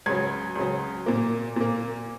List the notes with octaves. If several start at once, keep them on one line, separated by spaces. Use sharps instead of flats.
C#2 C#3 F#3 G#6
C#2 C#3 F#3
A#2 A#3
A#2 A#3